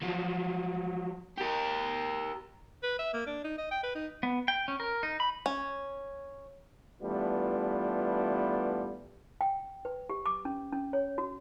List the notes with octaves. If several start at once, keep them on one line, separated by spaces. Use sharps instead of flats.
F3 F#3
G4 A#4
B4
E5
A#3
D4
D#4
D#5
G5
B4
D#4
B3
G5
C#4
A#4
D#4
B5
C#4
E3 G3 A3 B3 D4 F4
G5
B4
G4
D6
C#4
C#4
C#5
F#4